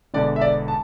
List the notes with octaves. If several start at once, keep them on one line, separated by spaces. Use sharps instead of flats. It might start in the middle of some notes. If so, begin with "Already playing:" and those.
E1 E2 D3 D5
E5
D5
A5